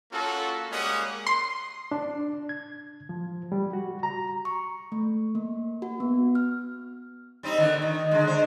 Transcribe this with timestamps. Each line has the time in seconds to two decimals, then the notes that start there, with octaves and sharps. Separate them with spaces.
0.11 A#3 C#4 F4 F#4 A4
0.70 G3 G#3 A#3 C#4 F#5 D#6
1.27 C6
1.91 D4
2.49 G#6
3.09 F3
3.52 G3
3.73 F#4
4.03 A#5
4.45 C#6
4.92 A3
5.35 A#3
5.82 F#4
6.00 B3
6.35 F6
7.43 G3 C4 D#4
7.58 A#2 D3 D#3
7.82 D#3
8.11 D3 G#3
8.27 D3 D#3 C5